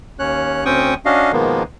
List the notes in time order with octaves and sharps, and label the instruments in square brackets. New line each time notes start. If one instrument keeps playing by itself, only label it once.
[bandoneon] D#2 C#4 C#5 F#6
D2 C4 C#4 G5 C#6 D#6
C#4 D4 F#4 D#5 F5
B2 D#3 F3 G#3 A#3 B3